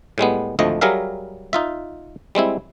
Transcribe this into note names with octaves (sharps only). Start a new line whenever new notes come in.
A2 G3 G#3 B3
G#1 D2 F3 A3 D#5
F#3 G3 G#4 A#4 E5 F5
D#4 F4 E5
G3 G#3 C4 E4